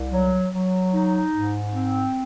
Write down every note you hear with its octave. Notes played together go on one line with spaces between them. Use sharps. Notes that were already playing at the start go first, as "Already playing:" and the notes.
Already playing: C2
F#3
F#3
D#4
G#2
C4